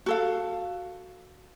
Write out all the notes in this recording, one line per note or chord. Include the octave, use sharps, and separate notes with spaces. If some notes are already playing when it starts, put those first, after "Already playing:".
F#4 A4 F5